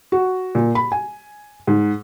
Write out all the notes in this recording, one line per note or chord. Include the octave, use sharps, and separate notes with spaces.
F#4
A#2
B5
G#5
G#2